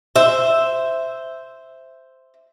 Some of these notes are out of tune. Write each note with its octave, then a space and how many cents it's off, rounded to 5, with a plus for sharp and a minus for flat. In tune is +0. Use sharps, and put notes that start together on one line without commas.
C5 -5 E5 +0